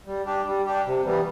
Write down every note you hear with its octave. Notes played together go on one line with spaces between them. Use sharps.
G3
D4 G4
G3
D4 G4
C3
E3 G3 B3